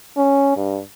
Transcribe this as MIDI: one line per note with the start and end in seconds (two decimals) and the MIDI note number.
0.17 0.56 61
0.56 0.79 43